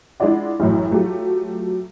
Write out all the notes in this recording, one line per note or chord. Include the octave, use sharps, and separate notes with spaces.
G#3 D4 E4 F4 D5 F#5
A1 F#2 A2
F#3 A3 F4 G4